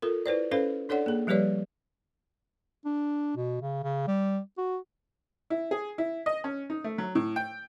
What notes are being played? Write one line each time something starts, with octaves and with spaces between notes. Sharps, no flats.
F4 A4 A#4
E4 B4 C5 D5
C#4 A4 B4 C5 F5
D4 A4 C#5 D5 F#5
A#3 G#4
F3 G3 G4 B4 C#5 D5
D4
B2
C#3
C#3
G3
F#4
E4
G#4
E4
D#5
C#4
D#4
A3
F#3
A2
G5